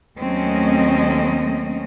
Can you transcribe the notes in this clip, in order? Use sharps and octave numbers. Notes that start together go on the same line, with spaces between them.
D#2 F#3 A3 C4 C#4 D#5